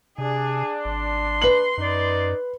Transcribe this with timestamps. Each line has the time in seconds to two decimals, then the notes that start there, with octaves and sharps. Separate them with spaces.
0.18 C3 D4 G#4
0.85 G#1 C6
1.42 B4 F#7
1.78 F#2 D#4 D5